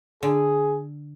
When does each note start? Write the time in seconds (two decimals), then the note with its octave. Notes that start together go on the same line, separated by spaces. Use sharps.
0.23 D3 G#4